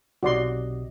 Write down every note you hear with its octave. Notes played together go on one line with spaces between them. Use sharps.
B1 C3 F#4 D5 D#5 C6